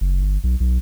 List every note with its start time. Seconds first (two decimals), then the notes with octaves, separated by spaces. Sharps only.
0.01 F#1
0.23 G1
0.44 B1
0.60 B1